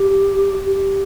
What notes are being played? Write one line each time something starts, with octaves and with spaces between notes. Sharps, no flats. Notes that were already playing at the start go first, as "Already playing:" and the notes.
Already playing: G4
G4